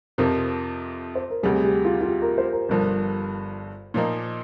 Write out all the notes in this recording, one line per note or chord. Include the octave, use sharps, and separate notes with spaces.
F2 C3 F3 A#4
C5
A#4
D2 C3 G3 G#4
G4
F4
F4
G4
A#4
C5
A#4
G1 G2 F3 A#4
A#2 F3 A#3 D#4